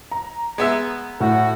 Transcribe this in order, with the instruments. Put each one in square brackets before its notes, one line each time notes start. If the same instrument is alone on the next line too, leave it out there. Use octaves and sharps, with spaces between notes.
[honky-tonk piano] A#5
[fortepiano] G#3 B3 E5
[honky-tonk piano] A2 [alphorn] F#4